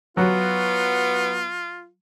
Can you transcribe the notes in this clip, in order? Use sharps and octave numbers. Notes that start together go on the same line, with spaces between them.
F#3 B3 F4